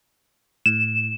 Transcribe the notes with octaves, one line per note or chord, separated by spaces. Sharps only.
A2 E7